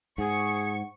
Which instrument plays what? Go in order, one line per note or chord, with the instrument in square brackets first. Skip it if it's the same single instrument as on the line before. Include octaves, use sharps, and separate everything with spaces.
[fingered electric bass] G#2 [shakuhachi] G#4 [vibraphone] C5 F#5 [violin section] C#6 C#7